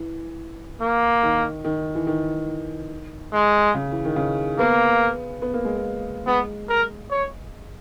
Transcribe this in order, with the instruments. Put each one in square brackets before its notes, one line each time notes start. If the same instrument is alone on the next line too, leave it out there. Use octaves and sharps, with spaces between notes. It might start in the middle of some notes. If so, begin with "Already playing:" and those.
Already playing: [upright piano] E3
[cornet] A#3
[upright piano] D#3
D#3
E3
D#3
[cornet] G#3
[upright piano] C#3
E3
D#3
C#3
[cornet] A#3 [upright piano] B3
[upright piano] B3
A#3
G#3
A#3
[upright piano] G#3 [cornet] B3
[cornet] A#4
C#5